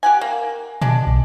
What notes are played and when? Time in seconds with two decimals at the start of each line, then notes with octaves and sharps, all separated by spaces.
0.03 G4 F#5 G#5
0.21 A#3
0.81 B2 G#3 D4
1.07 B1